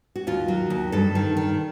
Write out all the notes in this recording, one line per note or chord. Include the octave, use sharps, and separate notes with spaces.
F#4
D#2 F4
F#3
D#2
G2 A4
D#3
D#3